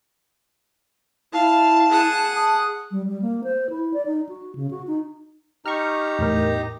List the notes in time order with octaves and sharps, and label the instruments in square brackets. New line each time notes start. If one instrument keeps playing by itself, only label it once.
[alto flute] E4 [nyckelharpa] F5 [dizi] A5
[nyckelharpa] G#4 F#5
[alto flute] A5 [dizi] D#6
[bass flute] G3
G3
A#3
C5
E4
D5
D#4
F#4
C#3
F#4
D#4
[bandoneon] D#4 G4 A#5 [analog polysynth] C#6 F6
[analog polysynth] E2 A2 A#4